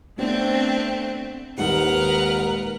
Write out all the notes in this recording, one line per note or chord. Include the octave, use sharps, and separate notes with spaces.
A3 B3 C4 D4
D#1 G#2 A#4 B4 F#5